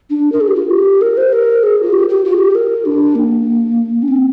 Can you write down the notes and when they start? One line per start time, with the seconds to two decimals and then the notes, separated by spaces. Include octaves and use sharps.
0.10 D4
0.32 A#4
0.41 G#4
0.48 G4
0.55 F4
0.70 G4
1.01 A#4
1.17 C5
1.33 A#4
1.63 G#4
1.83 F4
1.93 G4
2.09 G4
2.25 F4
2.33 G#4
2.39 G4
2.55 A#4
2.85 D4
3.15 A#3
4.02 D4
4.08 C4